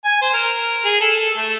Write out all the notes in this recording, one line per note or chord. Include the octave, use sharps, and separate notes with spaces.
G#5
C5
A#4
G#4
A4
A3